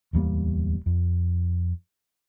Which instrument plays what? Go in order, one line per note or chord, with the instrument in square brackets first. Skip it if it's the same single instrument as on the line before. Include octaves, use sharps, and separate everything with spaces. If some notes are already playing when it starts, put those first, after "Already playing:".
[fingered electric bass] D1 E2 G3 A#3
F2